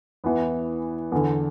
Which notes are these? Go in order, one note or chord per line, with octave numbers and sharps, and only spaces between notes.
E2 E3 B3
E2 D3